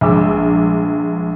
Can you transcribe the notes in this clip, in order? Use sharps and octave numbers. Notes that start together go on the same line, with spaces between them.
A#1 G2 G#3 G#5 D6 E6